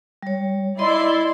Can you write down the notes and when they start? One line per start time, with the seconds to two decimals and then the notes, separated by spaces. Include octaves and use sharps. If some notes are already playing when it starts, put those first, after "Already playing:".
0.22 G3 C#5
0.79 E4 D5 D#5 C6